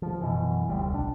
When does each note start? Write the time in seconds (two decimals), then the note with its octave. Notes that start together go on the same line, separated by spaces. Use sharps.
0.02 F3
0.21 F#2 B2 E3
0.69 F1 D2 G3
0.92 B1 D4